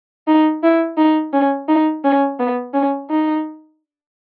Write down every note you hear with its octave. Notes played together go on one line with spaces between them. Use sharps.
D#4
E4
D#4
C#4
D#4
C#4
B3
C#4
D#4